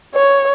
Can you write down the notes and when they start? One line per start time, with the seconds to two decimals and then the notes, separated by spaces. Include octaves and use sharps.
0.14 C#5